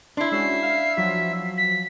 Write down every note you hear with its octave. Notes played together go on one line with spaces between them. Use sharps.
D4 E4 C6
G#3 C#4 F#4 E5 C7
F5
F3 F#3 F4 B6
B6